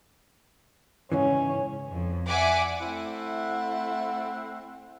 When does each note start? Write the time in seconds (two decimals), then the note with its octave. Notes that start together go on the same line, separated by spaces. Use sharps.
1.12 G#2 C#3 E3 C#4
1.89 F2
2.27 D5 E5 F#5 G#5 D6
2.80 A3 C4 E4 F#5